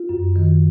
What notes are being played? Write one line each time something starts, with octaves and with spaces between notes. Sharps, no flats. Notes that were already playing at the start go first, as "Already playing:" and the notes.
Already playing: F4
F#2
D#3